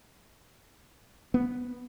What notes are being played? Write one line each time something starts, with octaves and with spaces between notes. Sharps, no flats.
B3